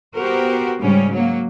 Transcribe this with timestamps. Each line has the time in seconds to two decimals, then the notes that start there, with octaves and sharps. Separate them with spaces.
0.17 B3 F#4 G4 A#4 C5
0.82 G#2 C#3 G3 C#4
1.14 F#3 A#3